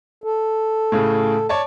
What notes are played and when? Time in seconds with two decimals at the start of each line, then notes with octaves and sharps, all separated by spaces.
0.24 A4
0.92 A2 C#3 G#4
1.49 C#5 D5 A5